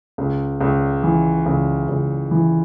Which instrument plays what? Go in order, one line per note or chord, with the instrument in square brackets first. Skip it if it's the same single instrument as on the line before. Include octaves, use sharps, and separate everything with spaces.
[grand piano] C#2
C#2
E3
C#2
C#2
E3